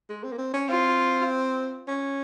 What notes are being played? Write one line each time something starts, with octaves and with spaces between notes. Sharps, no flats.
G#3
C4
A#3
C4
C#4
C4 F4
C#4